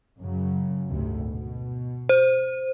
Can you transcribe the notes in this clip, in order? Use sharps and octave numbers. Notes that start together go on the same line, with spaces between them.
F#2 C#3 F#3
G#1 D2 C3
B2
C5